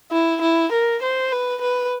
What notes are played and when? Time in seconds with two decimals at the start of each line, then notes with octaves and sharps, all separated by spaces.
0.12 E4
0.41 E4
0.72 A#4
1.02 C5
1.32 B4
1.61 B4